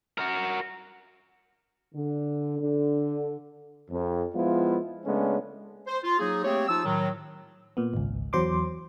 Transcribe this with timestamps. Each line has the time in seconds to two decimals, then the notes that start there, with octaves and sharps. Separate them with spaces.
0.18 F#4 A#4
1.94 D3
2.60 D3
3.89 F2
4.34 F3 G#3 B3 E4 F4
5.05 C#3 G#3 A3 B3 C#4 D4
5.87 C5
6.04 F4
6.19 F#3 A#3 D#4 G#4
6.44 A3 A#3 C4 G4 G#4 C#5
6.68 F3 D#4 F4 E6
6.85 A2 D#3 F#3
7.77 A#2 B3
7.94 G#1 C#2
8.33 E2 F#3 C5 C6 D6